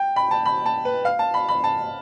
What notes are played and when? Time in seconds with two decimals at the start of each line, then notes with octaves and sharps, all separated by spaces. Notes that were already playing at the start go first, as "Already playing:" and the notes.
Already playing: G5
0.16 B5
0.31 A5
0.46 B5
0.66 A5
0.85 B4
1.05 F5
1.19 A5
1.34 B5
1.49 B5
1.64 A5